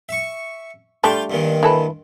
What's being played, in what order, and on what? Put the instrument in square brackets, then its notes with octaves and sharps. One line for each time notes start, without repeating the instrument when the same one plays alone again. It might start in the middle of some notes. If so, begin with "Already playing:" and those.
[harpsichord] E5 C#6
[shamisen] G3 A3 D4 [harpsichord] F4 G5
[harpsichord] G2 A#2 D#3
[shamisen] E3 A4 B4